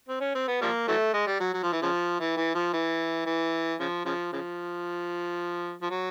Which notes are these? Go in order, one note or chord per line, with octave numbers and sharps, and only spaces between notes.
C4
C#4
C4
B3
F3 G3 A#3
E3 F#3 A3
G#3
G3
F#3
F#3
F3
E3
C#3 F3
E3
E3
F3
E3
E3
C#3 F3
C#3 F3
C#3 F3
F3
F#3